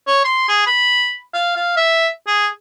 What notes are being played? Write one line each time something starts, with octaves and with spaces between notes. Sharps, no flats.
C#5
C6
G#4
B5
F5
F5
E5
G#4